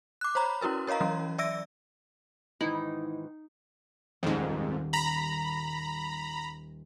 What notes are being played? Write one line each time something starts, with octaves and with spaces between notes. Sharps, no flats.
D6 F#6
C5 C#5 A#5 B5
C#4 E4 F#4 A#4 B4
A#4 C#5 D#5 F5 A#5
E3 F#3 C#4
D5 E5 E6 A#6 D7
G#2 D#3 E3 D#4 E4
D#1 F2 G#2 G3 E6
A#5 B5